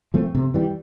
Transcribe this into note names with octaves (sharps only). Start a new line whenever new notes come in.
F3 A3 C4
C3
E3 G3